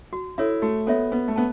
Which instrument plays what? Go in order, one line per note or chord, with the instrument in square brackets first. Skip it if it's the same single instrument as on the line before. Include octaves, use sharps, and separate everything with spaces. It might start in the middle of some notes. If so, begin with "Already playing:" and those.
[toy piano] F#4
[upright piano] E4 [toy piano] A4 C#5 E5
[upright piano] A3 [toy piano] F#4
[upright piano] B3 [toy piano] A4 C#5 E5
[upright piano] B3 [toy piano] B4
[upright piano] A3
[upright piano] B3 [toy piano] A5